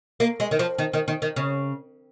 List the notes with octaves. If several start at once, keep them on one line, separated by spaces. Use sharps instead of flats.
A#3
G#3
D#3
F3
D#3
D#3
D#3
D#3
C#3